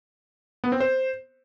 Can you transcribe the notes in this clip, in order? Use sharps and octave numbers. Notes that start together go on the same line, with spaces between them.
B3
C4
C5